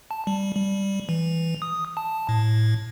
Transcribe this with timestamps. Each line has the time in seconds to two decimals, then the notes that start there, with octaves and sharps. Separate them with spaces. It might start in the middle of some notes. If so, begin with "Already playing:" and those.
0.11 A5
0.27 G3
0.56 G3
1.09 E3
1.62 D#6
1.97 A5
2.29 A2